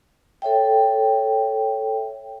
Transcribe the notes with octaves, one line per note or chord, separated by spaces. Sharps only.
A4 C#5 E5 G5